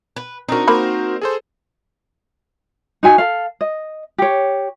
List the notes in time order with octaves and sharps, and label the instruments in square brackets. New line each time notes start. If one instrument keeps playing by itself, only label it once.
[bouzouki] B4
[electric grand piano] C4 D4 A#4 [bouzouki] D#4 F#4
[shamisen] A#3 B5 [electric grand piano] C4 A#4 C5
[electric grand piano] G#4 A4 C5
[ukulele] D#4 F#4 G#5
A4 F5
D#5
G4 C#5